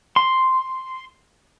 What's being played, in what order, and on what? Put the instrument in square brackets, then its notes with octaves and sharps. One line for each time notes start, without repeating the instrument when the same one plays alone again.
[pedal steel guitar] C6